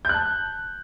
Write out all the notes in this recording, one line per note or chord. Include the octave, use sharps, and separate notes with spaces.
A5 F#6 G6